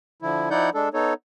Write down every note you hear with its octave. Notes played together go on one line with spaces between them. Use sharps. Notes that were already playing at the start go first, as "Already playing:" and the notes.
D3 F3 E4
F3 D#4 E4 D5 F#5 G6
G#3 D4 A4
B3 D#4 A4 C#5